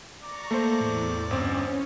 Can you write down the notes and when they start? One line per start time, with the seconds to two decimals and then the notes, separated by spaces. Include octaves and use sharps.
0.22 D5 A#5 C#6
0.51 A3 A#3 C5
0.81 E2 A2
1.31 G1 G2 C4 C#4